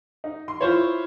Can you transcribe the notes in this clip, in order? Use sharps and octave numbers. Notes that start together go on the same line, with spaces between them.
D#4
C6
E4 F4 C5 C#5